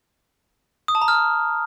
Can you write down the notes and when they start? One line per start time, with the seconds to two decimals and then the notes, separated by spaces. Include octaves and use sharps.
0.88 D#6
0.95 A5
1.02 A#5
1.08 F6